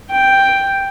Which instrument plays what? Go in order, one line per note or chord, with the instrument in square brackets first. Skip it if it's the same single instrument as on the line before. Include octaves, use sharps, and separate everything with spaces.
[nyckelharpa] G5